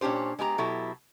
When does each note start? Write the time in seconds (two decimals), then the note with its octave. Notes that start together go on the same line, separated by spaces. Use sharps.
0.01 A#2 C#4 D4 G4 C5
0.39 G#3 B3 G4 A#5
0.58 B2 F#3 E4 G4 A4